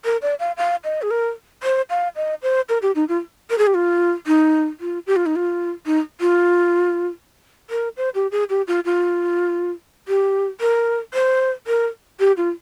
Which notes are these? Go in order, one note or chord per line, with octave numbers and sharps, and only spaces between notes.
A#4
D5
F5
F5
D#5
G#4
A#4
C5
F5
D#5
C5
A#4
G4
D#4
F4
A#4
G#4
G4
F4
D#4
F4
G4
F4
D#4
F4
D#4
F4
A#4
C5
G4
G#4
G4
F4
F4
G4
A#4
C5
A#4
G4
F4